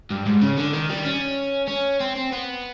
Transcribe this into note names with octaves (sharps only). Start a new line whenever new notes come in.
G2
G#2
C#3
D3
D#3
G3
C#4
C#4
C4
C4
B3